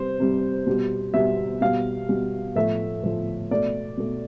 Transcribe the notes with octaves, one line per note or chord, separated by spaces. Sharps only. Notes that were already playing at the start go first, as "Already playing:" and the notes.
Already playing: C3 G3 C5
C3 G3
B2 G3
B2 G3 E5
B2 G3 F5
B2 G3
A2 F3 A3 E5
A2 F3 A3
B2 A3 D5
B2 A3